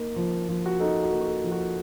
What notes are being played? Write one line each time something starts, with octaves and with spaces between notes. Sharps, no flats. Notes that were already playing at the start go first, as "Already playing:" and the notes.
Already playing: A#3 D#4
F3
F3
F#4
D#4 A4
F#4
A#3
F#4
A4
F3
F#4